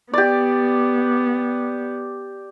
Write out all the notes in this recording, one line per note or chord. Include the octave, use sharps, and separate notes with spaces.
B3 G4 D5